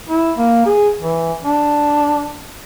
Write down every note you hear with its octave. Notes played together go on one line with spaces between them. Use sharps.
E4
A#3
G#4
E3
D4